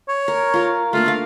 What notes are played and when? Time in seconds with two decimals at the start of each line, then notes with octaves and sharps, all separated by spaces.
0.08 C#5
0.28 A#4
0.54 F4 A#4
0.93 A3 A#3 D4 F4
1.06 A#4 F5